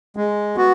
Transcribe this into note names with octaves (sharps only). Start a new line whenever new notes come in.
G#3
B3 F#4